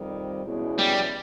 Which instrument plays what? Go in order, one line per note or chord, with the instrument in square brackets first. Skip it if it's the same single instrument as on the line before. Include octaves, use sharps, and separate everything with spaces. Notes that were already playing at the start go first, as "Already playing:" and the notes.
Already playing: [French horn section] F2 C3 D#3 G3
E2 B2 G#3 C#4 E4
[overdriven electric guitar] G3